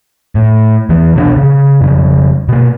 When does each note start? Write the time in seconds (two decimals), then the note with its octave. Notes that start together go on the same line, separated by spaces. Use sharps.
0.35 A2
0.89 E2 E3
1.15 C2 B2 C4 D4
1.37 C#3
1.81 F2 C#3
2.48 B2 A#3